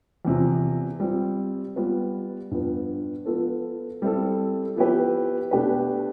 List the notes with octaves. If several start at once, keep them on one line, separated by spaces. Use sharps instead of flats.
E2 C3 F3
G3 C4 F4
G3 B3 F4 B4
G2 F3 B3
F3 B3 F4 A4
G3 C4 E4 A4
F3 B3 E4 G4 B4
B2 A3 D4 G4 B4